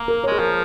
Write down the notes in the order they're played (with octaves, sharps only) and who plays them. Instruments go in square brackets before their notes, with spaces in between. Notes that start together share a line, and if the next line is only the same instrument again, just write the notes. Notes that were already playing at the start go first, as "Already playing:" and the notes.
Already playing: [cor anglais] A#3
[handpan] A#4
C#5
[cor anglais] G#3 [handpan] G#4
[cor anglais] F3 [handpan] A#4